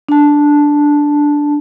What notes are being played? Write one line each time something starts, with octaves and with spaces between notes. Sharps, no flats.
D4 A5